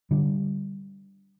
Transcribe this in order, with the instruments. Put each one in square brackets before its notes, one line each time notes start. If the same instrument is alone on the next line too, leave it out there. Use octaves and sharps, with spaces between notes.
[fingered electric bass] D3 G3